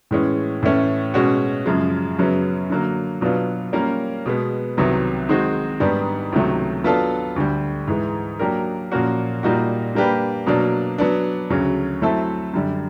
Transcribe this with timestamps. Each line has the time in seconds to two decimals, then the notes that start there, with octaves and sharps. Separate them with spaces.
0.11 A2 E3 G#3 C#4
0.63 A2 E3 A3 C#4
1.14 B2 G#3 C#4 F#4
1.66 F#2 C#3 F3 G#3
2.18 F#2 C#3 F#3 B3
2.70 D3 F#3 A#3
3.21 B2 F#3 B3 D4 F4
3.73 G3 A#3 C#4 F4 A#4
4.26 B2 G#3 B3
4.77 C2 C3 D#3 F#3 B3
5.29 D#3 G#3 C4 D#4 F#4
5.80 G#2 D#3 G3 B3 D4
6.32 C#2 C3 D#3 F#3 A3
6.84 F#3 B3 D4 F4 A4
7.36 D2 D3 G3
7.87 G#2 E3 G#3
8.39 F#3 A#3 D4 G4 A#4
8.92 A#2 F3 A#3 C#4 F#4
9.43 A#2 G3 A#3 D#4 F#4
9.95 G3 A#3 D4 G4 B4
10.46 B2 F#3 A#3 D4
10.98 F#3 B3 D4
11.50 D2 C#3 F#3
12.02 F#3 A3 C4 E4 A4
12.54 F#2 D3 G3